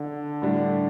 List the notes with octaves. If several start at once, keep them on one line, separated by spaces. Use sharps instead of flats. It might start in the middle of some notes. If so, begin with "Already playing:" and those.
Already playing: D3
A2 G3 D4